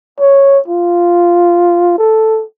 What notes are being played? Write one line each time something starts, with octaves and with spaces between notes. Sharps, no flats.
C#5
F4
A4